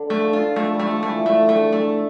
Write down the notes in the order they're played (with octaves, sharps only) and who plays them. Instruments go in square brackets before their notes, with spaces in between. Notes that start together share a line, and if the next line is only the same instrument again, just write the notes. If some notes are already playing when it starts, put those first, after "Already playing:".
Already playing: [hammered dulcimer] D3
[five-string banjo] A3
[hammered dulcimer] F3
[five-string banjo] F4
[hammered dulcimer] F3 [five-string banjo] A3
[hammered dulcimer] G3
[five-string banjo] A3
[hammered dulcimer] F3
[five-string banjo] A3
[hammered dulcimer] E3
[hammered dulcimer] D3 [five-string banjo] A3
[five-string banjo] A3
A3